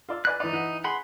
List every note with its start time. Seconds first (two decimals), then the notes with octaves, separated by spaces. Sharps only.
0.09 F4 D5 E6
0.25 B4 D5 G#5 F#6
0.40 E3 D#4 D5
0.53 E3 F#5
0.84 G#4 F#5 B5 C6